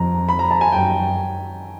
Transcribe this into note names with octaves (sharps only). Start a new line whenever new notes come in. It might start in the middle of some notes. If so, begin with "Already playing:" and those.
Already playing: F2 A#5
B5
A#5
A5
G#5
F#2 G5